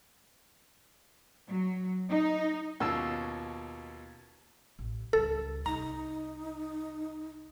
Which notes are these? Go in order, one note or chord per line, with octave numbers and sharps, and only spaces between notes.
F#3
D#4
D#2 B2 C#4 F4 A5 E6
A1
C#2 G3 A4
C2 D#4 A#5